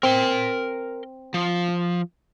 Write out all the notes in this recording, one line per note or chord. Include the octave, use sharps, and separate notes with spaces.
C4 A#4 C6
F3